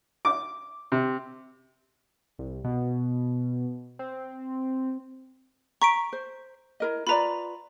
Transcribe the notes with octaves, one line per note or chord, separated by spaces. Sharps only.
D6
C3
C2
B2
C4
A#5 C#6 B6 D7
C5
E4 A#4 D#5
F4 B4 D5 A#5 B5